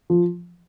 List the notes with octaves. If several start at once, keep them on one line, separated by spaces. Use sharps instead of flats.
F3